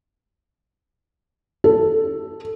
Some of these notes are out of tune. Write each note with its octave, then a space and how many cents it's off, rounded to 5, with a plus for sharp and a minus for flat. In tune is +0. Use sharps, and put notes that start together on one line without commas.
A4 +5